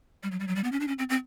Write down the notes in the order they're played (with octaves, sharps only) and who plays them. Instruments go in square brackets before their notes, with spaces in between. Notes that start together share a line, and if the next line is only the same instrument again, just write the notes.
[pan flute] G3
F#3
G3
F#3
G3
B3
C#4
D4
C#4
C4
C4